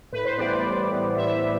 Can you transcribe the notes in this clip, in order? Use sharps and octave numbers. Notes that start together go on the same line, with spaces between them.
A2 B4
C5
E3 G3 B3 D5
D5
A2
E3 G3 B3
A2 E5
B3